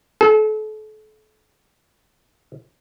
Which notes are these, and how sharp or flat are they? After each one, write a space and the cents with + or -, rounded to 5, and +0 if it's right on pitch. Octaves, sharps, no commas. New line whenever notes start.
A4 -35